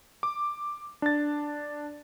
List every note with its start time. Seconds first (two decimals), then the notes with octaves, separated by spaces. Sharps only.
0.23 D6
1.02 D4 A6